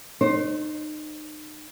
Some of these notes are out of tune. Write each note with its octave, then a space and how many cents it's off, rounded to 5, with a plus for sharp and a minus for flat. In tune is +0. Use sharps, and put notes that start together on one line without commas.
D#4 -30 C5 +10